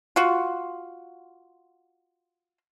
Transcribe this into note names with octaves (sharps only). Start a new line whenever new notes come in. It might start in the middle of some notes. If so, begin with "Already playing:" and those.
F4 F#4